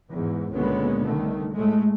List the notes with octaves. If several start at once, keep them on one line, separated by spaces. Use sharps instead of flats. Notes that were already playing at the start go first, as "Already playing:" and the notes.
E2 G#2
C#2 A#2 D3 G#3 B3 C#4
C2 D3 D#3 A3
A2 G#3 A3